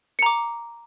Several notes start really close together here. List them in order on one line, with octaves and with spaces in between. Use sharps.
C#7 A#5 D6